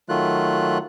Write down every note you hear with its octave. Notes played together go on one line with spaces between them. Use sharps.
D#3 F#3 A3 F4 F#6